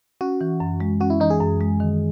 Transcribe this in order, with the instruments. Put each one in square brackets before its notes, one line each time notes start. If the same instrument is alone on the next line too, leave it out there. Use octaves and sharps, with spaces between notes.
[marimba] C#4 [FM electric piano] F#4
[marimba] E3
F#2
G#3
[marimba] C#4 [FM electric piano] F#4
[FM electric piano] E4
[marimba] E3 [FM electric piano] D#4
[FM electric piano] G#4
[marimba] F#2
G#3
D#3